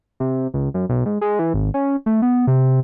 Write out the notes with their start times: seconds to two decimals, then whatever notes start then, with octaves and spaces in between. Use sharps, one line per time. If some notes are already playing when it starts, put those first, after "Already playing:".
0.20 C3
0.54 C#2
0.74 F#2
0.89 B1
1.06 G#2
1.21 G#3
1.39 E3
1.54 G#1
1.74 C#4
2.06 A3
2.22 B3
2.47 C3